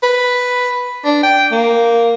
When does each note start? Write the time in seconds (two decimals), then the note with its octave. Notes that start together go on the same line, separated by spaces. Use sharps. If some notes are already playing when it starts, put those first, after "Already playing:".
0.03 B4
1.05 D4
1.23 G5
1.51 A#3